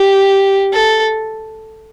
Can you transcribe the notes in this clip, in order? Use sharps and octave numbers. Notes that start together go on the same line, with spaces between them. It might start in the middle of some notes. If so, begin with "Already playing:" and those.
Already playing: G4
A4